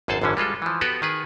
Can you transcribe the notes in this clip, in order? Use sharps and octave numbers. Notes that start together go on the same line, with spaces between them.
G#1 F#2 G#4 A4 C5 A5
G#1 F#2 D3 E3 C#4
G3 G#3 F4 A4
E3 F3
B3 F#4 G4 A4 B4
D#3 G#4 B4